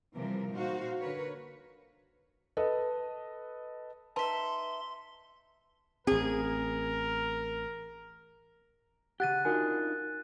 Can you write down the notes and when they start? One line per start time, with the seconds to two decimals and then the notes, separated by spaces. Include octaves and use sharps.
0.15 C3 E3 F3 G3 A#4
0.52 A#2 D#4 F#4 C5 F5
1.00 D3 A#4 B4 C#5
2.57 A4 B4 D#5
4.16 D#4 B4 E5 A5 C6
6.07 A1 C4 G#4 A#4
9.20 C#3 G4 F#5 F#6 A6 D#7
9.45 D4 D#4 F4 F#4 A#4 G#5